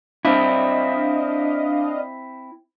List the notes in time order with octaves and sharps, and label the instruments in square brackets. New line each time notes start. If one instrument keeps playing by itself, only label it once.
[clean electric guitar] C4 E4 [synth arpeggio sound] D4 D#5 F5